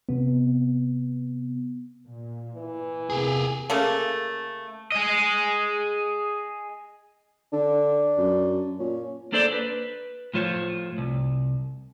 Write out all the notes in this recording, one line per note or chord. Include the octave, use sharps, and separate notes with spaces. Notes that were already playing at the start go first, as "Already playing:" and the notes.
C3 B3
A#2
E3
E2 C3 A#3 G4 G#4
C#3 A3 A#3
G#4 D#5
D3 D4
F#2
A#2 C#4
A#3 D4 A4 C5 D5
B4
A2 F3 F4 C5 C#5
C2